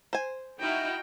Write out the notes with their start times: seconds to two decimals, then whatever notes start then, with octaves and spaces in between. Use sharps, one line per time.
0.13 C5 G#5
0.60 D#4 E4 F#4 G5 F6